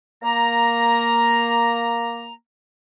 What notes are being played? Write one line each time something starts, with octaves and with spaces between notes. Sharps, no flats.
A#3 A#5